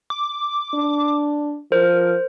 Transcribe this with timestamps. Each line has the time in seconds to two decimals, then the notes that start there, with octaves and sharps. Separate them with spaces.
0.10 D6
0.74 D4
1.72 F3 A#4 C5